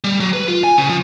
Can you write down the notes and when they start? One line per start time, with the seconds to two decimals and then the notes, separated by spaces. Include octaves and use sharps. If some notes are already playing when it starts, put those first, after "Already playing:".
0.04 G3
0.20 F#3
0.33 B4
0.48 F4
0.64 G#5
0.78 C#3
0.89 F3